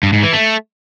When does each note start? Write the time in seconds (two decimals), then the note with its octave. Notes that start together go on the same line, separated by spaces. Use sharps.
0.03 G2
0.13 G#2
0.23 E3
0.33 A3